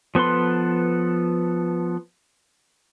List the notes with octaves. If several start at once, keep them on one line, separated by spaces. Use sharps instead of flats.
F3 B3 A4 B4 C6